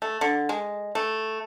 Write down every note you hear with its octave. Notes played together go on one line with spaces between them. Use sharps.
A3
D3
G#3
A3